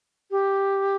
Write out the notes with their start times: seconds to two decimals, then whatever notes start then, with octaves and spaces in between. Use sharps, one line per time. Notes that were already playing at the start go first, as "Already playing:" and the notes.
0.31 G4